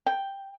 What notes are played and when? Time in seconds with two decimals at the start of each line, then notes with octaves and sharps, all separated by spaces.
0.06 G5